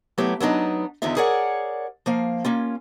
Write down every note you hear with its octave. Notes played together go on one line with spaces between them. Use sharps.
F#3 A3 B3 E4 G4
F#3 B3 D4 D#4
E2 D3 D#3 D#4 F4 E5
G#4 A#4 C#5 D5 F#5
F3 A#3 F5
A#3 C#4 F4